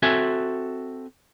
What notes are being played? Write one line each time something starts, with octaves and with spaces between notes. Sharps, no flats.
C4 F#4 A4 E5 G#5